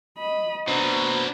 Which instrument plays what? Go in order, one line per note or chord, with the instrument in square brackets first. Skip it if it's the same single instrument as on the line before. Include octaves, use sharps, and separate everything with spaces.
[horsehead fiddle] D#5 B5
[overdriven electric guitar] B2 [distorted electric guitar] D4 C5 [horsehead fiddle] A#5